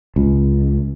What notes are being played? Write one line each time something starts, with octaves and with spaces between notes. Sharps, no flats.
C#2